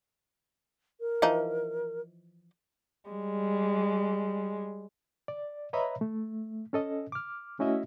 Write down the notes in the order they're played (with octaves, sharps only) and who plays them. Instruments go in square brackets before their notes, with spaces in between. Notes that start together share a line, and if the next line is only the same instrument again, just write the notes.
[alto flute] A#4
[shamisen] E3 F3 D#4
[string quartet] G3 G#3
[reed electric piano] D5
B4 C#5 D#5 E5 A#5 B5
A3
C#4 A4 D#5
D6 F6
A3 C#4 E4 F#4 D#5 E5